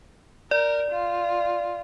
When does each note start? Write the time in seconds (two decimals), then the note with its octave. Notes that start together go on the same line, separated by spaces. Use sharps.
0.51 A#4 D5
0.91 F4